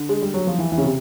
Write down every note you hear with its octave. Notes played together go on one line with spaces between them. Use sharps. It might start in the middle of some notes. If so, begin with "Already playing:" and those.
Already playing: D3
G#3
G3
F#3
F3
E3
E3
C#3
C3